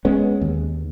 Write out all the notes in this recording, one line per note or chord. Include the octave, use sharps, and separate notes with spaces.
G#3 B3 C#4
D#2